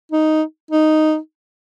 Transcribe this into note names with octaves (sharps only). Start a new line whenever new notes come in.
D#4
D#4